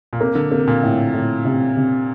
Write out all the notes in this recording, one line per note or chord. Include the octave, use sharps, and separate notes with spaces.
A#2
C3 A#3
D3
C3 A#3
A#2
A2
A2
C3
C3